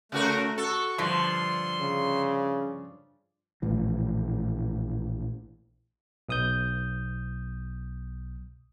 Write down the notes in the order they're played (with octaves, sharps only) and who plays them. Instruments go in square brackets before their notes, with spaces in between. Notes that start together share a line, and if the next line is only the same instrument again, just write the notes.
[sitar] C#3 F#4 A#4 [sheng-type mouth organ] A3
[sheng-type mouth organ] F#4 C#6 [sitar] A4
[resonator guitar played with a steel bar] G2 F3 [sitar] D3 [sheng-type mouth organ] C6
[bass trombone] C#3
[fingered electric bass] A#1 A2 E3
[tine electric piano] B1 D#6 G6